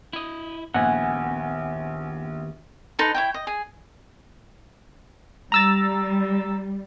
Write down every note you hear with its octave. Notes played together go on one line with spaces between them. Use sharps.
E4 D#5
A#1 D#2 B3 F#5 G#5
D#4 A4 B4 C6
E4 C#5 G5
D#5
G#4
G3 A#5 E6 A6